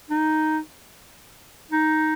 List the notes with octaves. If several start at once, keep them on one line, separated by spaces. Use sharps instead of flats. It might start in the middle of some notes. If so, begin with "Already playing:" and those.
D#4
D#4